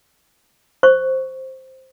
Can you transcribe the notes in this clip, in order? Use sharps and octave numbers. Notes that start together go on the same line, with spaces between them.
C5 C#6